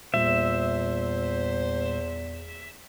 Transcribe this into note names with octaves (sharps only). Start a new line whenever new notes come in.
E2 A#2 G3 F4 C5 E5